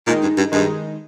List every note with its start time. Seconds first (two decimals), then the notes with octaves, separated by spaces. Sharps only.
0.07 A#2 D#3 G#3 D#4
0.22 G2
0.37 G2
0.52 G2 D#3 G#3 D#4